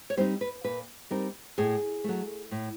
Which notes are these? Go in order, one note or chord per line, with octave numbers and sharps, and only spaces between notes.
C#5
G3 C4 D#4 C5
B4
A#2 B4
G3 C4 D#4 A#4
A2 G#4
F#3 A3
A2